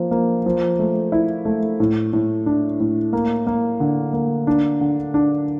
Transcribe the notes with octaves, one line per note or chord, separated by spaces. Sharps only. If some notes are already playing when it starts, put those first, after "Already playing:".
Already playing: F3 A#3
A#3
F3
A3
E4
A3
A2
A2
D4
A2
A#3
A#3
D3
A#3
D4
D3
D4